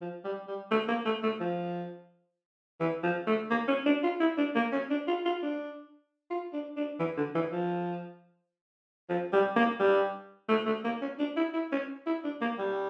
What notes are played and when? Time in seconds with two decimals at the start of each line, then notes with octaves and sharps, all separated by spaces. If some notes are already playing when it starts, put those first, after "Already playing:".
0.01 F3
0.25 G3
0.48 G3
0.71 A3
0.88 A#3
1.06 A3
1.23 A3
1.41 F3
2.80 E3
3.03 F3
3.27 A3
3.51 A#3
3.68 C#4
3.86 D4
4.04 F4
4.20 E4
4.38 D4
4.55 A#3
4.72 C#4
4.90 D4
5.08 F4
5.25 F4
5.43 D4
6.30 F4
6.53 D4
6.77 D4
7.00 E3
7.17 D3
7.35 E3
7.52 F3
9.10 F3
9.33 G3
9.56 A#3
9.80 G3
10.49 A3
10.66 A3
10.84 A#3
11.02 C#4
11.19 D4
11.37 E4
11.54 E4
11.72 C#4
12.07 E4
12.24 D4
12.42 A#3
12.59 G3